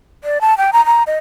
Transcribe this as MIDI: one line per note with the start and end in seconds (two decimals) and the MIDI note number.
0.24 0.41 74
0.41 0.57 81
0.58 0.71 79
0.73 0.85 82
0.86 1.03 82
1.07 1.17 75